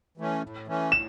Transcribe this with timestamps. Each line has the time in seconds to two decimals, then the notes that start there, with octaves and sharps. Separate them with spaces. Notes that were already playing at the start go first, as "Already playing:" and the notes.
0.17 E3 A3 C#4
0.42 A2
0.67 E3 A3 C#4
0.92 A2 E7